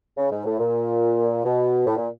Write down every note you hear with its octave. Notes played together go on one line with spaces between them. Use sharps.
C#3
G#2
A2
A#2
B2
A2
A#2